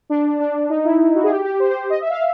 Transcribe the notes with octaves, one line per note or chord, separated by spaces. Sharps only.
D4
D4
D#4
E4
F#4
G#4
G4
G4
C5
C5
D#5
E5
F5